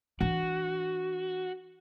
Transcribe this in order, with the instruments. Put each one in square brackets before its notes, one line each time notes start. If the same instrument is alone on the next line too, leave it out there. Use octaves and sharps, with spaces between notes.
[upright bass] E3 D4 [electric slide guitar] F#4